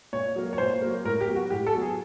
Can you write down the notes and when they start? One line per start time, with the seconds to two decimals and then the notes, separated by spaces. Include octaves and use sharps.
0.13 A#2 C#5
0.36 F#3 A#3
0.53 C#5
0.58 A#2 C5
0.82 F#3 A#3
1.04 A2 A#4
1.21 G4
1.27 F#3 B3
1.36 F#4
1.50 A2 G4
1.67 A4
1.75 F#3 B3
1.81 G#4